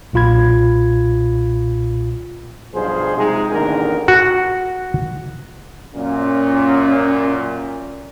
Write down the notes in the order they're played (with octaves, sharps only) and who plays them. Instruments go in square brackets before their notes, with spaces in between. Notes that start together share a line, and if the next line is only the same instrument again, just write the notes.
[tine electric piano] B1 A#2 F4 B5 G#6
[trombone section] B1 G2 F3 G#4 C5
C3 G#3 D#4 G#4
A1 D#2 D3 D#3 A#4
[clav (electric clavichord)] F#4
[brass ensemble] F#2 A#2 [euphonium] C#4